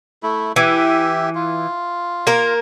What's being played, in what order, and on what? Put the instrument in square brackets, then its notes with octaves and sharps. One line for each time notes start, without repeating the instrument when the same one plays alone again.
[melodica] A3 E4
[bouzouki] E3 [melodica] G4 E5
[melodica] F4
[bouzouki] A#3 A#4